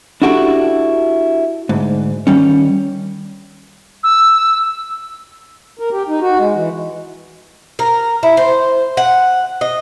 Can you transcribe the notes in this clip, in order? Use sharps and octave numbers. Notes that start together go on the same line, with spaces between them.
D4 E4 F#4 G4 A4
D2 G#2
D#3 G3 C#4
E6
A#4
G4
D#4
F#4
G#3
E3
A#4
E4
C5
F#5
D#5